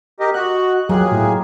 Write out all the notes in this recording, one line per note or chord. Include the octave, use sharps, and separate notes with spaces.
G4 A#4 D#5
F#4 D#5 F#6
F#3 A#3 F4 G4 G#4
A2